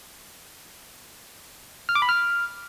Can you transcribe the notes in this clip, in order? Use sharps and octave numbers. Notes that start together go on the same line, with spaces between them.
F6
D6
B5
F6